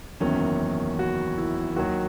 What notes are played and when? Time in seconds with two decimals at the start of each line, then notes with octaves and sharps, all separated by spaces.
0.20 F#1 E2 D#3 F#3 C#4
0.99 F#4
1.38 E4
1.76 D#2 D#3 F#3 F#4